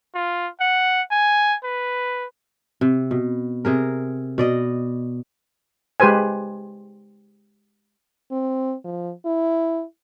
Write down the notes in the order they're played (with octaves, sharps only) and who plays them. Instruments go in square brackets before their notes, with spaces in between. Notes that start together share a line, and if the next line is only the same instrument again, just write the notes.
[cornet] F4
F#5
G#5
B4
[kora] C3
B2
C3 G#4 A#4
B2 D5 D#5
[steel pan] G#3 G4 B4 C5 G#5
[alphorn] C4
F3
E4